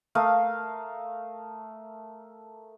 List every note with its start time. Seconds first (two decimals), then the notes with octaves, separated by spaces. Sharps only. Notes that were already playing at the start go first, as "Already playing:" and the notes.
0.15 A3 A#4 F5 D#6